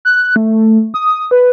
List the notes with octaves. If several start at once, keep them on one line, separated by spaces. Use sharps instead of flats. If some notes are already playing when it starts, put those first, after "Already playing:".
F#6
A3
D#6
B4